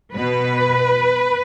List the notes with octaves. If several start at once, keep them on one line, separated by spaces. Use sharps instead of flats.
B2 B4